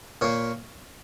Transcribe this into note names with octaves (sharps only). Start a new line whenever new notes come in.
A#2 A#3 C#5